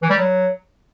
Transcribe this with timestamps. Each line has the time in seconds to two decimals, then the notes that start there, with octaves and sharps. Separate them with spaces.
0.02 E3
0.10 G3
0.17 F#3